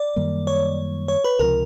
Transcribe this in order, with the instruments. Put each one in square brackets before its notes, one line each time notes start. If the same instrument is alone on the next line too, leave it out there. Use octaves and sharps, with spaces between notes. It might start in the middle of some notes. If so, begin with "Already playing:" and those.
Already playing: [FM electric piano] D5
[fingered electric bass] F#2 D#3 G3 A#3
[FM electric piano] C#5
C#5
B4
[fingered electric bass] C#2 C3 F3 [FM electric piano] A#4